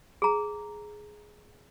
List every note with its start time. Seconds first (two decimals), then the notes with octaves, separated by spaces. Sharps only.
0.22 G#4 A#5